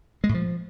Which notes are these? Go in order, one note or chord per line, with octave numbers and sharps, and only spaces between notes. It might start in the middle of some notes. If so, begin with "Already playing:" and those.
G#3
A2
F3